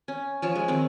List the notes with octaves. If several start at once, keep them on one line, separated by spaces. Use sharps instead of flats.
C#4
F3 C#4 F4 C#5
G#3
D#3 G#3 C4